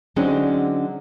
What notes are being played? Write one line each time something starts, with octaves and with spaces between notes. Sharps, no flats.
D3 F#3 G#3 C4 C#4 D#4